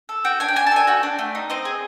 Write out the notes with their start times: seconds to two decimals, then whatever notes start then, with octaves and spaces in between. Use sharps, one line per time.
0.09 A4
0.25 F#4 G5
0.40 D4 G#5
0.48 G5
0.56 D4 G#5
0.66 A5
0.72 A4 G#5
0.87 F#4 G5
1.03 D4
1.19 A3
1.35 D#4
1.50 C4 D#5
1.65 G#4